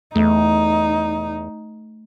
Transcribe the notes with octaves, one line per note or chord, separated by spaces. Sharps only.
E2 A3 D#4